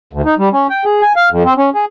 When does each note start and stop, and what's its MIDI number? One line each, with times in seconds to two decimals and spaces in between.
0.13 0.21 38
0.25 0.35 63
0.38 0.49 55
0.53 0.67 61
0.70 0.84 79
0.85 1.01 68
1.02 1.13 80
1.16 1.29 77
1.31 1.43 41
1.45 1.53 60
1.57 1.70 61
1.75 1.85 68